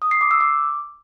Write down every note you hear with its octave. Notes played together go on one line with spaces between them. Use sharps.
D#6
C7
D6
E6
D6